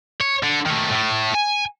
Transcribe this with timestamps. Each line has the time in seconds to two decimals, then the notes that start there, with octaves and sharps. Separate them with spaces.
0.21 C#5
0.43 D3
0.66 D#3 A3
0.91 A2 A3
1.35 G#5